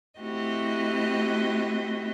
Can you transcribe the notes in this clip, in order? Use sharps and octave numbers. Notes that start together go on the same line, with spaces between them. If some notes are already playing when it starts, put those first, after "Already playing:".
A3 C4 E4 F#4 G4 D#5